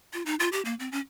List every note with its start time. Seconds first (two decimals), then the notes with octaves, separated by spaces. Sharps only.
0.13 F4
0.26 D#4
0.39 F4
0.52 G4
0.65 A#3
0.80 C4
0.92 C#4